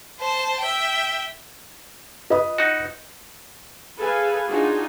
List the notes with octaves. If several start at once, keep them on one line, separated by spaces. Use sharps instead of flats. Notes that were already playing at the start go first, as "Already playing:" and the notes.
C5 A5
E5 G5
F4 B4 D#5 D#6
D#4 F#4
G#4 A4 B4 F5 G#5
D4 D#4 F4 F#4 G#4